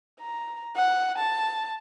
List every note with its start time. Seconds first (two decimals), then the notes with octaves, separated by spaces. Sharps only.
0.20 A#5
0.76 F#5
1.18 A5